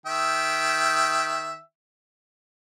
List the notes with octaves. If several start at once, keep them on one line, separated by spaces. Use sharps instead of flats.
D#3 E5 G5